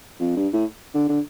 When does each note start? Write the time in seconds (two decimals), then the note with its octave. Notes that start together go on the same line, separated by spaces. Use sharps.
0.20 F2
0.37 G2
0.53 A2
0.94 D3
1.09 D3